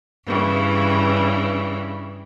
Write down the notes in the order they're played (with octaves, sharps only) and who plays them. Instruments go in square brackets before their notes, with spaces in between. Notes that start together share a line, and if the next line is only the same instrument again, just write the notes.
[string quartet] G2 C#3 E3